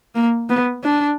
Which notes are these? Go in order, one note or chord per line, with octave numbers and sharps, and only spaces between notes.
A#3
B3
D4